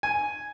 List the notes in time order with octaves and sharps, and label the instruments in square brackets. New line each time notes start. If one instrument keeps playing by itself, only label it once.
[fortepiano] G#5